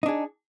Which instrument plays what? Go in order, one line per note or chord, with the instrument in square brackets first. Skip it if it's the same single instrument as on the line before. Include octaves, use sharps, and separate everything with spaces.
[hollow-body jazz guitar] D#4
D4
G#4